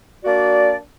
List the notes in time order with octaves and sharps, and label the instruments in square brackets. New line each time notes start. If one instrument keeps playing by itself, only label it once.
[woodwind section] A#3 D4 F#4 D5